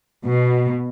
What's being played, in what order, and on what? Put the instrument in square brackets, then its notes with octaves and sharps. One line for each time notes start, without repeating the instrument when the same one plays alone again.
[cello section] B2